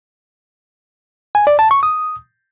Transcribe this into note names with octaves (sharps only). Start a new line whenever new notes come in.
G#5
D5
A5
C#6
D#6